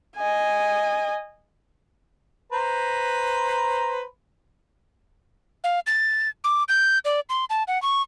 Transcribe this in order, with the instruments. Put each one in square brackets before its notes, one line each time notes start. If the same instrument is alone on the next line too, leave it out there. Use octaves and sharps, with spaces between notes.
[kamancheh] D#5 G#5
[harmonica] B4 C5 A#5
[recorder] F5
A6
D6
G6
D5
C6
A5
F#5
C#6